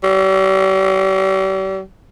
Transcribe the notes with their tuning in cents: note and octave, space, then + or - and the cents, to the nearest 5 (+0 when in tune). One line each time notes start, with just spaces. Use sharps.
G3 -40